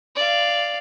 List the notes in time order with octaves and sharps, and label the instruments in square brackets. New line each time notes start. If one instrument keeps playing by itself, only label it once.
[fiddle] D5 F5